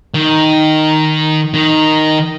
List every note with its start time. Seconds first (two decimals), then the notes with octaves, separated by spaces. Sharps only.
0.14 D#3
1.54 D#3